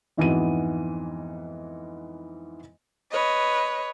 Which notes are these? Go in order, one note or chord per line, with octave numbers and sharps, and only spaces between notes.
F2 G#2 E3 B3 F#4 D#7
B4 C#5 D#5